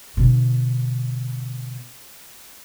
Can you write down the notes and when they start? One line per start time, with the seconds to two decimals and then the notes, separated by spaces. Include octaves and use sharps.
0.17 B2 D3